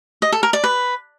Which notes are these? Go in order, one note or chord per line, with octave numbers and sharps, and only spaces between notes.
D#5
A4
A#4
D5
B4